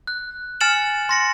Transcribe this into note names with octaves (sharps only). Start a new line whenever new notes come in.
F#6
G#5 F6 A6 C#7 E7 F#7
C6 A#6 C#7